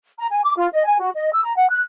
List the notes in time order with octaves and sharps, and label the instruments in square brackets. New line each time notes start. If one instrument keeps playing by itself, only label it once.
[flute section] A#5
G#5
D6
F4
D#5
G#5
F#4
D#5
E6
A#5
F#5
F#6